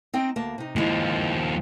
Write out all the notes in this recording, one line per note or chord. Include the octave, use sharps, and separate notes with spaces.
C4 D#4 G5
D2 A#3 A5
C3 D#4
D#2 F3 G#3 E4